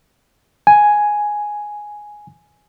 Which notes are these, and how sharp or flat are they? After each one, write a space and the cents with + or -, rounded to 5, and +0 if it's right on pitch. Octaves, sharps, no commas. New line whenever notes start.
G#5 +5